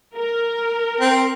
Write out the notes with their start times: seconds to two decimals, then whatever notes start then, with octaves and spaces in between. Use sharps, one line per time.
0.17 A#4
1.00 C4